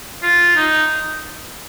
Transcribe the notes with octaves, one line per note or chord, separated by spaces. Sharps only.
F4
D#4